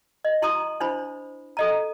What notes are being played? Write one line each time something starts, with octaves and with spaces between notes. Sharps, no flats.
D#5
E4 A#5 C6 D#6
D4 E4 C5 B5
A4 D#5 A#5